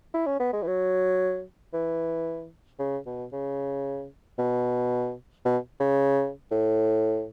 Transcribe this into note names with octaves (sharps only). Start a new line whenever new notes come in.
E4
C#4
B3
G#3
E3
F#3
E3
C#3
B2
C#3
B2
B2
C#3
A2